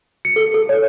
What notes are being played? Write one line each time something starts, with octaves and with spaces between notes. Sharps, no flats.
C#7
A4
A4
C#5